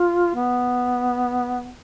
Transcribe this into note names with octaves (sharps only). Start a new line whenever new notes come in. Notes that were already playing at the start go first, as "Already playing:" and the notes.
Already playing: F4
B3